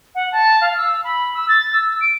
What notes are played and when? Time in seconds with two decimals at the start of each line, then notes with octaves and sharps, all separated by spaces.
0.15 F#5
0.32 A5
0.61 F5
0.77 E6
1.04 B5
1.34 E6
1.49 A6
1.73 E6
2.01 D7